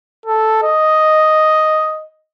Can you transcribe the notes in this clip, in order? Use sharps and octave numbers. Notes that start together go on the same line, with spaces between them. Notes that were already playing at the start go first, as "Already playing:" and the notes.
A4
D#5